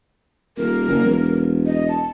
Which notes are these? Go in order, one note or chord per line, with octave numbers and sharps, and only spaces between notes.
D#1 A#4
F#1
E1
D#5
A5